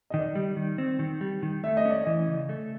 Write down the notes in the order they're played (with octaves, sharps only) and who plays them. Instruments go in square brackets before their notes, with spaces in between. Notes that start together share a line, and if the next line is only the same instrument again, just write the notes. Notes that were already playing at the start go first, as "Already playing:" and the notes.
[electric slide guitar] D#3 [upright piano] D#5
[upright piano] D5
[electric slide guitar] G3
D#3
C4
D#3
G3
D#3
[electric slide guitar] A3 [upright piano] E5
[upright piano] D#5
[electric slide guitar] C#4 [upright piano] D5
[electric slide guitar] E3 [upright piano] D#5
[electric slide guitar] C#3
A3